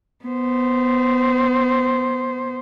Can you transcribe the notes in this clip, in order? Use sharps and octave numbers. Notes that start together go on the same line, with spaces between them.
B3 C5